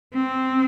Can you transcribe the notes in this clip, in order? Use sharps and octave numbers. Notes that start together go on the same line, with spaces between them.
C4